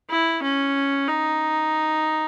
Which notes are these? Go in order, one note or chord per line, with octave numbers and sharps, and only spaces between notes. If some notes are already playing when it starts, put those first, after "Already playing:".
E4
C#4
D#4